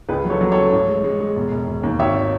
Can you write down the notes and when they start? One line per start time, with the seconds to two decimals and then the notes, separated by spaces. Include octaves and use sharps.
0.09 C#2 G#4 B4
0.25 F#3
0.30 A4 C#5
0.41 F#3
0.52 C#3 A4 C#5
0.72 A1
0.88 G#3
1.04 G#3
1.20 G#3
1.36 E1
1.52 E1
1.68 E1
1.83 D#2
1.99 G#1 C#5 E5